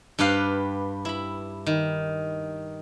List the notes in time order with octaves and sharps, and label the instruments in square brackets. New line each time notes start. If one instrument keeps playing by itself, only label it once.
[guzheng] G2 G4 B4 F5
E4 B5
D#3